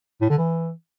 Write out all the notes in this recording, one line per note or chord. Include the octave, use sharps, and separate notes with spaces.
A2
D3
E3